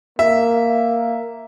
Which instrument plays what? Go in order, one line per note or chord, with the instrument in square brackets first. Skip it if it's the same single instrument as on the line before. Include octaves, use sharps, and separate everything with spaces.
[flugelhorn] A#3 [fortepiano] E5